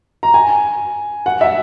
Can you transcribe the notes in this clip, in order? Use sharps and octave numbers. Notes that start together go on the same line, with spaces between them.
A#5
G#5
F#5
E5